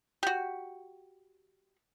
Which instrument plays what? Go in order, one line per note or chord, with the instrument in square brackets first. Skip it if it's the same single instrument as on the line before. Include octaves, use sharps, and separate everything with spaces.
[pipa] F#4 G4